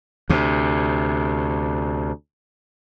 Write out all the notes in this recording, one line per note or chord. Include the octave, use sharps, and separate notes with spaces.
D2 C3